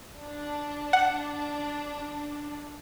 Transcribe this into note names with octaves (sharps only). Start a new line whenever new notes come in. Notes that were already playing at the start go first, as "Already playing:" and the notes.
D4
F#5